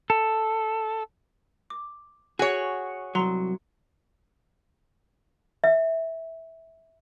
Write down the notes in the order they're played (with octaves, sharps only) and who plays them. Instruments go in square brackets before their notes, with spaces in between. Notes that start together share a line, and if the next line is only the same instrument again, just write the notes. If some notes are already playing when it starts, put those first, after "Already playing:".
[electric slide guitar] A4
[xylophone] D6
[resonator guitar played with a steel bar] F#4 C#5 [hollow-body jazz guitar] G#4 [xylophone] F#5 G#5
[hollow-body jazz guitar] C2 F#3 [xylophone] A#5 C6 F7
[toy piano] E5